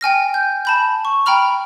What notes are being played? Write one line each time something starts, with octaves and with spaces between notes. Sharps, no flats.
G5 G#5 F6 A#6
G6
A5 B5 G6
C#6
G5 A#5 B5 F6 F7